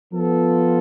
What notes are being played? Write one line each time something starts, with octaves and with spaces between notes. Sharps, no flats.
F3 B3 F4 A4